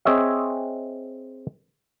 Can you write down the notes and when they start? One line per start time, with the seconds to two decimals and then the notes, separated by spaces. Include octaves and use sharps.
0.05 C4 G#4 C#5 D#5 E5